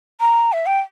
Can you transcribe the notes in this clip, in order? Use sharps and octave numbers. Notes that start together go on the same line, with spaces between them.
A#5
E5
G5